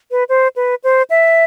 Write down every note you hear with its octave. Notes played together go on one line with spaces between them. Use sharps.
B4
C5
B4
C5
E5